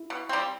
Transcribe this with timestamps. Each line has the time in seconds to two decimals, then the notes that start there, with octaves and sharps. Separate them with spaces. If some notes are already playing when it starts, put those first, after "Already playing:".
Already playing: E4
0.10 B2
0.29 G3 C4